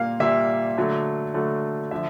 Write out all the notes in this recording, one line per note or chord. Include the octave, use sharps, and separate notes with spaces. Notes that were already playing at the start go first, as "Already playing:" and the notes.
Already playing: A#2 G3 A#3 F5
A#2 G3 A#3 E5
D3 F#3 A3
D3 F#3 A3
D3 F3 E5